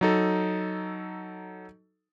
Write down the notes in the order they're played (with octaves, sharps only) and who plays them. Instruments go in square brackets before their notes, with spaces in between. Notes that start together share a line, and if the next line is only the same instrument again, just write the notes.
[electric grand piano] F#3 D#4 A4